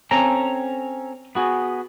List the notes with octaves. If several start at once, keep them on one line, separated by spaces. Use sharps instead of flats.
C4 C#4 A4 A#5
B3 F#4 G#4